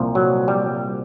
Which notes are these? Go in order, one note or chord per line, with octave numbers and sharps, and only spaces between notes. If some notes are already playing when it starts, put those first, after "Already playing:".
Already playing: C2 A#2 F3
F#3
G3